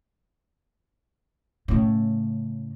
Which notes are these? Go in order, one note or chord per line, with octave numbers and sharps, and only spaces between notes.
A2 C#3